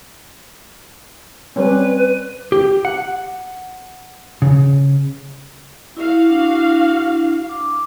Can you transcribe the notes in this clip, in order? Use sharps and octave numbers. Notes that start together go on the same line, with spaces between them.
G3 C4 C#4 B4
G4
F#5
C#3
E4 F#4 F5
D4 E4
D6